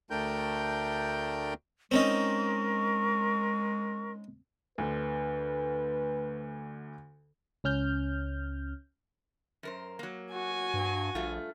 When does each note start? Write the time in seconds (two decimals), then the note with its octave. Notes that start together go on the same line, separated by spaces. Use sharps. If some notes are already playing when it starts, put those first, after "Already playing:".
0.10 D2 A3 D4 A#4 G5 G6
1.91 G#3 C4 C#4 D#4 A#4 C#6
4.78 D2 D3 B4
7.64 C#2 C#4 F6 G6
9.63 F#2 A#4 C5
9.99 F#3 A#3
10.33 F#4 G#5
10.74 G2
11.15 A#1 G2 A3 F4